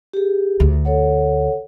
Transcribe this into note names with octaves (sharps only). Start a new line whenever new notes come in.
G4 G#4
D2
A4 C#5 F#5